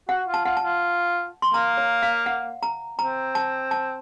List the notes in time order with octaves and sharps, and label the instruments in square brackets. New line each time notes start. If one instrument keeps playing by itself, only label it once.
[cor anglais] F#4 [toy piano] F#5
[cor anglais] F4
[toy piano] A5
[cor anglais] F4 [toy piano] F#5
[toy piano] A5
[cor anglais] F4
[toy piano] C6
[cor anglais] A#3 [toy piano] A#5
[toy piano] C#5
F5
F#5
A#5
[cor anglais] C4 [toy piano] A#5
[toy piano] A5
A5